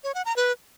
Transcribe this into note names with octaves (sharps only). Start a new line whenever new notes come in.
C#5
F#5
A#5
B4